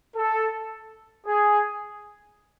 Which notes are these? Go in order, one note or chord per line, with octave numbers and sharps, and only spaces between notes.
A4
G#4